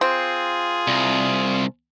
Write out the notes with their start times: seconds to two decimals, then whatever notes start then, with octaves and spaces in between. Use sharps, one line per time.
0.01 C4 F4 G#4
0.87 C2